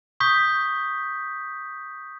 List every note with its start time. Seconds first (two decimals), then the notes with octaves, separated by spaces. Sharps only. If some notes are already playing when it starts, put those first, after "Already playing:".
0.20 C#6 D#6 G6 B6